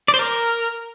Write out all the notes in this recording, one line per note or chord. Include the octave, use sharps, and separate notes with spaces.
D5
C5
A#4